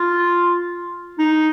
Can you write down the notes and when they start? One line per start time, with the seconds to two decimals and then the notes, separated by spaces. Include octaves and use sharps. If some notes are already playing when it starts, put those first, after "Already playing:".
Already playing: F4
1.19 D#4